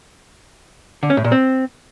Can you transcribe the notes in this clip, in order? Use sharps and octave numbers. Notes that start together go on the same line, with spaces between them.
D3
C#4
A2
A#2
C4